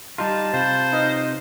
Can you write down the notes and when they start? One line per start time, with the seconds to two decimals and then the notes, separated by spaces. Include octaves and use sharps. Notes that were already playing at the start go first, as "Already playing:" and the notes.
0.18 G3 D#4 F4 G4 D#5 A5 G6
0.53 C3 F4 C5 F5 B5
0.92 D#4 B4 D#5 F6